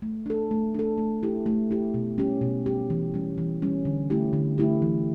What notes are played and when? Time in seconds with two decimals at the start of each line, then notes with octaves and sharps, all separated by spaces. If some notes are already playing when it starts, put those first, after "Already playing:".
0.02 A3
0.26 D4 A4
0.51 A3
0.74 D4 A4
0.98 A3
1.23 E4 G4
1.46 A3
1.71 E4 G4
1.94 B2
2.18 G3 C#4 G4
2.41 B2
2.66 G3 C#4 G4
2.90 E3
3.14 G3 C#4
3.38 E3
3.62 G3 C#4
3.85 D3
4.10 A3 E4 G4
4.33 D3
4.58 A3 E4 G4
4.82 E3